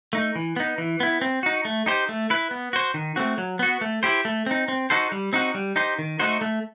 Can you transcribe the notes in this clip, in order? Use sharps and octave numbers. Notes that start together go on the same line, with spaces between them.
A3 D#4
E3
B3 D#4
E3
B3 E4
C4
D#4 F#4
A3
D#4 G4 C5
A3
E4 B4
B3
F#4 C5
D#3
A3 C4 F#4
F#3
B3 F#4
A3
E4 G4 C5
A3
C4 D#4
C4
D#4 F#4 A4 C5
G3
C4 D#4 F#4
G3
D#4 G4 C5
D#3
A3 D#4 F#4 C5
A3